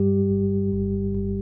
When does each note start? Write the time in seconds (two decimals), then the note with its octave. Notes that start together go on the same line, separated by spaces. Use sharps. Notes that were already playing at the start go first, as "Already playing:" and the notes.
Already playing: G2 G3 G4
0.29 G1
0.71 G1
1.14 G1